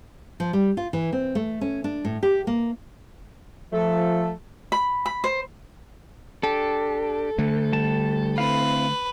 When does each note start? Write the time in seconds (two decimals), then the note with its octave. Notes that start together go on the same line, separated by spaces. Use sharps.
0.40 F3
0.53 G3
0.77 F4
0.93 E3
1.12 C4
1.35 A3
1.61 C#4
1.84 D4
2.05 A2
2.23 G4
2.47 A#3
3.73 F3 A3 A4
4.72 B5
5.06 B5
5.24 C5
6.43 D4 G4 A4
7.38 D3 A3
7.72 G3 A5
8.38 C4 E4 B4 F5